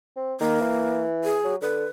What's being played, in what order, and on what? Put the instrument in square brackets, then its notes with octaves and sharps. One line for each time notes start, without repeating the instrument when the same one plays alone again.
[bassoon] C4
[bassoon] D#3 [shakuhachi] A#3
[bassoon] E3
[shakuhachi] G#4
[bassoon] F#3
[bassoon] D3 [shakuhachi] B4